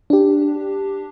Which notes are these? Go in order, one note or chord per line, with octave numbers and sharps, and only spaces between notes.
D4 G4